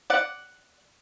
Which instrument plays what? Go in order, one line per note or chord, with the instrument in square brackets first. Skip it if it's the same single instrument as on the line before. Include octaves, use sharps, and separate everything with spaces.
[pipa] D5 F#5